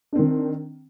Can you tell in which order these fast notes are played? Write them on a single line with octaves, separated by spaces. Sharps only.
D4 C4 D#3